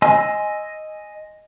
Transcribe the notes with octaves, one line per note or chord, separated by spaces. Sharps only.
D#5 G#5 C6 E6